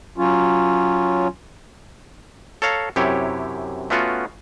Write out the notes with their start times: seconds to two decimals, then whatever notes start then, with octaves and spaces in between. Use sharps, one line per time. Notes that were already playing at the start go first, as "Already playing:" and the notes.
0.18 F#3 C#4 F4
2.62 A4 C#5 F5 A#5
2.96 F#2 C3 E4 G4 C#5
3.90 A3 B3 C#4 F4 F#4